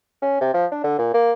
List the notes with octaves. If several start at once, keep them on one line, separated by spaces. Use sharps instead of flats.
C#4
C3
F3
D4
D3
A#2
A#3